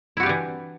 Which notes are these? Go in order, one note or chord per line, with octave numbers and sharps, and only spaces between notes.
E3 D4 E4 F#4 G4